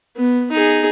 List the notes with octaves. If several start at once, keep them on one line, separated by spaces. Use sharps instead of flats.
B3
D#4 G#4